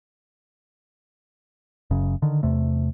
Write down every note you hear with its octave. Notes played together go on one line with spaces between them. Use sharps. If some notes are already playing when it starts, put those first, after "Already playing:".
F#1 F#2 C#3
D3 D#3
E2 C3 A3